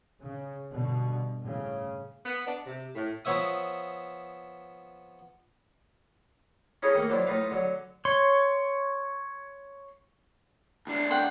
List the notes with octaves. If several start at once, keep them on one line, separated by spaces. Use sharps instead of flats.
C#3
G2 B2 D3
A2 C#3
B3
D4
C3
A2
F3 B3 C#5 E5 D#6
C#4 D#4 E4 G#4 A4 C#5
D#3 A3 A#3
F3 F#3 D4 E4 F4
A2 D#4 F4 B4 F5
D3 F#3
C#5 C6
C#2 D4
F#5 G5 C6